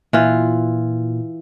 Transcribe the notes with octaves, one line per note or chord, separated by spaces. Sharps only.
A#2 E3 F4